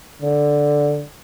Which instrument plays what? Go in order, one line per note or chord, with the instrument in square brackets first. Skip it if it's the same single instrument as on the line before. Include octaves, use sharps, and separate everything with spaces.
[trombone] D3